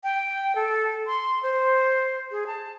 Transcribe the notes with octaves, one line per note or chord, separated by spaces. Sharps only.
G5
A4
C6
C5
G#4
A5